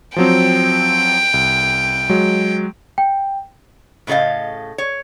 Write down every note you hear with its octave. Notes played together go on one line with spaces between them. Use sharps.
F3 F#3 C4 G5
C2
F#3 G#3
G5
A2 C#3 A4 D#5 F5
C#5